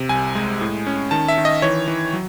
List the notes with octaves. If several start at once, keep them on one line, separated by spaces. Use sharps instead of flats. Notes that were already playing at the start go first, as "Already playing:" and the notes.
Already playing: C3
C2 G#5
G#3
A2
C#4
D#3 A5
E5
D#3
D#5
E3 C#5
E3
F#3